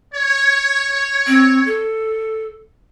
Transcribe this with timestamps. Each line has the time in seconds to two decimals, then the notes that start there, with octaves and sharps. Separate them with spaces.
0.14 C#5
1.27 C4
1.66 A4